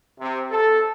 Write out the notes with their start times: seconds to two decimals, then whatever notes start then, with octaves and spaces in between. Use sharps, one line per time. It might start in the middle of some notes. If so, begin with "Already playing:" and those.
0.19 C3
0.49 A4